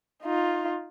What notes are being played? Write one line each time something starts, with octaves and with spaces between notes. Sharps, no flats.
D#4 F4